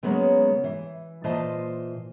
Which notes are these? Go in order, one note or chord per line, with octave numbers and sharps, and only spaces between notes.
C#3 F#3 G#3 A#3 B3 C#4
E3
A#2 E3 F4 C5 D#5 A5